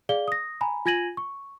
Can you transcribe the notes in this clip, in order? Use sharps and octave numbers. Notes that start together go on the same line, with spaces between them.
G#4 D5 F5 G7
D#6 A#6
G#5 A#5 B5
F4 G#5 G#6 A#6 D#7 F#7
C#6